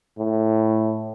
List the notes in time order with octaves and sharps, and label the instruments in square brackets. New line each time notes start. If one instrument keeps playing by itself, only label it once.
[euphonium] A2